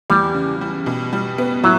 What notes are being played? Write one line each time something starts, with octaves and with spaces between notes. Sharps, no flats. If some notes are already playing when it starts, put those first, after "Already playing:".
E2 G3
C#3
G3
B2
G3
B3
A2 F#3